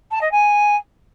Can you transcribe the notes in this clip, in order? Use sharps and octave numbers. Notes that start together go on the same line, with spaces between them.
A5
D#5
G#5